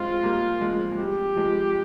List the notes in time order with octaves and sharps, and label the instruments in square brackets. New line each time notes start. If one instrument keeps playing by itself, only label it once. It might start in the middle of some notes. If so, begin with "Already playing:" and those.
Already playing: [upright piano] G#3 C4 [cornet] F4
[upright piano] G3 A#3
F3 G#3
G#3
[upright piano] G3 [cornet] G4
[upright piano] F3 G#3